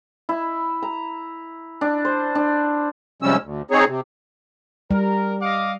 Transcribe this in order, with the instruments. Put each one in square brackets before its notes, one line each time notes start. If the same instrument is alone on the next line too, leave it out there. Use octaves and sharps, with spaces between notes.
[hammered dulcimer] E4
A#5
D4
C5
D4
[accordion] C3 F3 G3 G#3 C#4 E6
D2
C4 D#4 G#4 C#5
C3
[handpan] G3 [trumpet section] A#4
[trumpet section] D#5 F5 D6